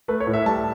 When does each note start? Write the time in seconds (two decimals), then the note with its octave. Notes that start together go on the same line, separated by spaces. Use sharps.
0.08 A3 B4
0.20 C#5
0.27 A2
0.33 E5
0.46 G3 A5